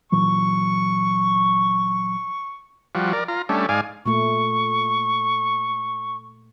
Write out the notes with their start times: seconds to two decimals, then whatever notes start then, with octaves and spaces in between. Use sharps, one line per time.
0.12 A#2 E3 F#3 C#6
2.95 F3 G3 F#4
3.13 A#4 D5
3.28 F4 A#5
3.49 G3 A3 C#4 D4
3.69 G#2 D5 F5 G#5
4.06 A#2 A3 C#6